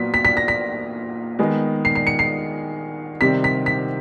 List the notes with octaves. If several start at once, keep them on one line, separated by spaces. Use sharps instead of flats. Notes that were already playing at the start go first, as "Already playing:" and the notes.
Already playing: A#2 F#3 B3 B6
B6
B6
A#6
B6
D#3 G#3 B3
C7
C7
C#7
C7
C3 D#3 G3 C4 B6
B6
B6